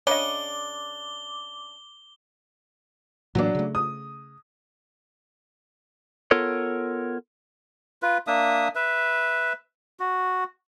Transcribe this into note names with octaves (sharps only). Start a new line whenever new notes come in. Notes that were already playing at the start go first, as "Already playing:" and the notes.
C#3 D4 C#5 D#5 D6 G7
A2 E3 F#3 A#3 D4
C#3 A3
D#6
B3 F4 A4 A#4 C#5
F4 B4
A#3 D4 E5 D#6
B4 E5
F#4